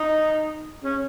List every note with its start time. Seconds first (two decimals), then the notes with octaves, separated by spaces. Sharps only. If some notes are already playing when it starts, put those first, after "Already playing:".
Already playing: D#4
0.84 C#4